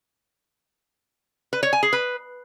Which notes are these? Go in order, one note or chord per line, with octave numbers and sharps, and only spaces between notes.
B4
C#5
G#5
G#4
B4